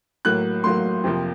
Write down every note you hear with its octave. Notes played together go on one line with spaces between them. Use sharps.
A2 F#3 A#3 F#6
A2 F#3 A#3 C6
F2 C3 F3 A#3